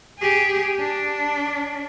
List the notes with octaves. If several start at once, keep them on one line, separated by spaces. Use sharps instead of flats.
G4 G#4
D4